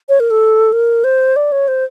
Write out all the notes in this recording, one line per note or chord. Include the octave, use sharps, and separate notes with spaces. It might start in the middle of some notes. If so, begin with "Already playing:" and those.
C#5
A#4
A4
A#4
C5
D5
C#5
C5